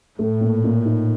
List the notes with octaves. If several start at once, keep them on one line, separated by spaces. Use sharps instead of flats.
A2 A3
A#2
A#2
D#4